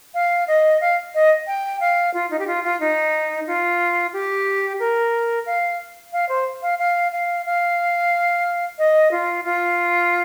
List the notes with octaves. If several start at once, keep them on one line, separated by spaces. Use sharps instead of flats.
F5
D#5
F5
D#5
G5
F5
F4
D#4
G4
F4
F4
D#4
F4
G4
A#4
F5
F5
C5
F5
F5
F5
F5
D#5
F4
F4